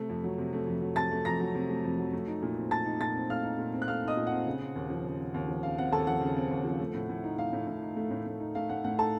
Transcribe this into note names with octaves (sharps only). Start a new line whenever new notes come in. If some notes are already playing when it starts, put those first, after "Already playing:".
Already playing: C3 A3
F2
F#3
C3
A3
F2
F#3
C3 A5 A6
A3
F2 A#5 A#6
F#3
C3
A3
F2
F#3
A3
D#4
A#2
C4
A3 A5 A6
D#4
A#2 A5 A6
C4
A3 F5 F6
D#4
A#2
C4
F#6
A3 F5 F6
D#4 D#5 D#6
A#2
F#5
C4
C#3
C4
D#2
F3
C#3
C4
D#2
F3
C#3 F5
C4 F#5
D#2 A4 A5
F3 F#5
C#3
C4
D#2
F3
A3
A2
A2
D#4
A3 F5
A2
A2
D#4
A3
A2
A2
D#4
A3 F5
A2 F#5
A2 F#5
D#4 A4 A5